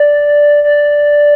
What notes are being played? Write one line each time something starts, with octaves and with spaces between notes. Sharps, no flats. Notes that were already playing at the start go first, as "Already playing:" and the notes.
Already playing: D5
D5